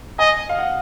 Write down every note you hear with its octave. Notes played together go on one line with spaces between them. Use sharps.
D#5 G#5
F5
F#5